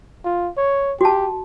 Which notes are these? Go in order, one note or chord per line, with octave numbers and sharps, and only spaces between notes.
F4
C#5
F#4 G4 A5